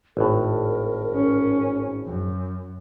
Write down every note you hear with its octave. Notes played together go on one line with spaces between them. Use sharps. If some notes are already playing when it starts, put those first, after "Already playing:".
G#1 A2 A#4
C#4
F#2